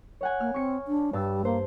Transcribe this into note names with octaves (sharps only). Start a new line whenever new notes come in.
C#5 F#5 G#5
A#3 F6
C4 C#6 C#7
D4
G2 G3 A5 E6
A#3 C5